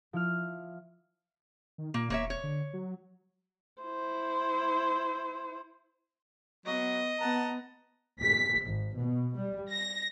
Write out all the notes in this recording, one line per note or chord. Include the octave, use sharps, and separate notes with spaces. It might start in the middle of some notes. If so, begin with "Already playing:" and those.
F3 E4 F6
D#3
A#2 A#3
E1 A#3 C#5 E5
C#5
D3
F#3
E4 C5
F#3 B3 D#5
B3 F#5 A5 A#5
B6
G#1
B2
G3
A#6